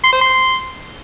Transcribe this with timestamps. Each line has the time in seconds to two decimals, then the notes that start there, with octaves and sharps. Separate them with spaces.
0.04 C6
0.13 C5
0.21 C6